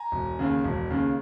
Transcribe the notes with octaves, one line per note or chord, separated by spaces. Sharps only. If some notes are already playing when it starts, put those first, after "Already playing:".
Already playing: G#5 A#5
E1
D#2 C#3
E1
D#2 C#3